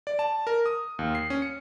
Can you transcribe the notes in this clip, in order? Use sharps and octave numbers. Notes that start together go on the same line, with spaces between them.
D5
A5
A#4
D#6
D#2
C7
C#4
C#7